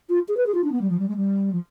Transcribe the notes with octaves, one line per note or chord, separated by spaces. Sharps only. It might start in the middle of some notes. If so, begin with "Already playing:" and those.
F4
G#4
B4
G#4
F4
D4
B3
G3
F3
G3
G#3
G3
F3